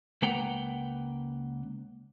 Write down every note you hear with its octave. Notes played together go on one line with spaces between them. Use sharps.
C#2 A#3 B4 F#5 G5 A#5